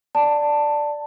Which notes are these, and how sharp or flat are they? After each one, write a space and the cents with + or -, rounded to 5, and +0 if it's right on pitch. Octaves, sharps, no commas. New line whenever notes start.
D5 +0 A5 +10